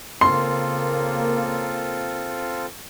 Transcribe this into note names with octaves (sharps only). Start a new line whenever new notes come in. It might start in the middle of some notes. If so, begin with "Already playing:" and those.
C#3 A#3 C4 F4 A4 C6